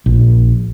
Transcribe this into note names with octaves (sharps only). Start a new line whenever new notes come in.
A#1